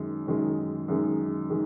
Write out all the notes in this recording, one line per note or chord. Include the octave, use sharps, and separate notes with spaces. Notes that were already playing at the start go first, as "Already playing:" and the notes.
Already playing: F#2 D#3 G#3
F#2 D#3 G#3
F#2 D#3 G#3
D#3 G#3